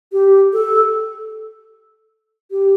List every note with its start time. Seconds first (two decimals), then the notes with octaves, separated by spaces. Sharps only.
0.12 G4
0.53 A4
2.51 G4